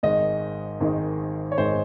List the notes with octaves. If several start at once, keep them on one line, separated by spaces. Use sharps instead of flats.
G#1 G#2 D#3 G#3 D#5
G#1 G#2 D#3 G#3
C#5
G#1 G#2 D#3 G#3 C5